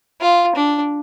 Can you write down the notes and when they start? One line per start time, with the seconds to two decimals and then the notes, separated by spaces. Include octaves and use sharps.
0.21 F4
0.56 D4